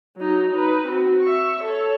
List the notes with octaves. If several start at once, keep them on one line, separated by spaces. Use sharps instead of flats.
F#3 D#4
D#4 B4
C4 F#4
E5 C#6
A4 C#5